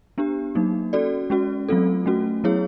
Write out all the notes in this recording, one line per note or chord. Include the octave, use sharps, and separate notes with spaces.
B3 D4 G4
F#3 A#3 D#4
C#4 F#4 A4 D5
G#3 C#4 F#4
F#3 A3 C4 F4 A4
A3 C#4 F#4
F#3 B3 E4 G#4 C#5